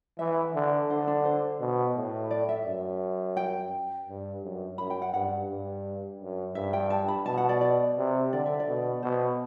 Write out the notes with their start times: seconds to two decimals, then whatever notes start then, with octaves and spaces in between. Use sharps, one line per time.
0.19 E3 E5
0.54 D3
0.89 D3 C5
1.07 D4
1.25 C5
1.60 B2
1.95 A2
2.31 D5
2.49 E5
2.66 F#2
3.37 G5
4.07 G2
4.44 F#2
4.78 F#2 B5
4.90 G5
5.02 F#5
5.14 G2 F#5
5.50 G2
6.20 F#2
6.55 G2 E5
6.73 G5
6.90 A5
7.08 B5
7.26 B2 A5
7.37 F#5
7.49 D5
7.61 D5
7.97 C3
8.32 D3 D5
8.46 E5
8.60 D5
8.68 B2
9.03 B2 C5